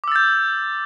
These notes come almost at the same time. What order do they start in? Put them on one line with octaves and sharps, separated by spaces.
D6 E6 A6 G6